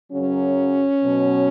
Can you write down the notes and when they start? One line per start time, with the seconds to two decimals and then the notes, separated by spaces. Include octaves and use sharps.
0.12 F#2 C#3 F#3 C#4
1.04 B2 F#3